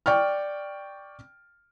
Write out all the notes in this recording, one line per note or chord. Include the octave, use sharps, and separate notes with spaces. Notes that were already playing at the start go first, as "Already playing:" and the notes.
D5 G5 C#6 F6